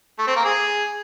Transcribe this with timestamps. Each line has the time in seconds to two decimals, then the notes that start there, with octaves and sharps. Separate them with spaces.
0.19 A3
0.27 C4
0.36 A#3
0.45 G#4